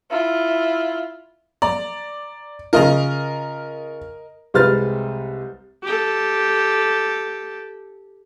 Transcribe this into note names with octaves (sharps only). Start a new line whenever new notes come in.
E4 F4
D5 A#5
C#3 F4 A#4 D#5 A#5
C2 G#3 B4 C5 F6 A6
G4 A4